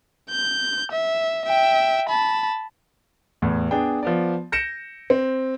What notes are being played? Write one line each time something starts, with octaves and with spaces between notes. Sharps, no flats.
G6
E5
E5 G5
A5 B5
E2 A2
B3 D4 G#4 G5
F3 B3 D5
G6 A#6 C#7 D7 E7
C4